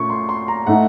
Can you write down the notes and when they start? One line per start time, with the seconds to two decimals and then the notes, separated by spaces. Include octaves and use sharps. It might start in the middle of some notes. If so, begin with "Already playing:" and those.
Already playing: A#2 A3 C#4 F4 C#6
0.10 C6
0.29 C6
0.48 A#5
0.66 A2 A3 D#4 F#5